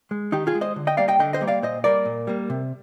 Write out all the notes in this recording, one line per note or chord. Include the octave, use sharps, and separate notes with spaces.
G#3
D#3 D#4 G4
F4 G#4
G#3
C5 D#5
D3
D#5 G5
G3 A#3 D5 F5
D#5 G5
D3 D#5 G5
C5 D#5
G3 A#3
D5 F5
A#2 C5 D#5
G3 A#3 A#4 D5
A#2
G3 A#3
C3